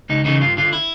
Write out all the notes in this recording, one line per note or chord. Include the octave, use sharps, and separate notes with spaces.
C#2 D#4
C#3 E3 D#4
G2 F4
D3 F4
E4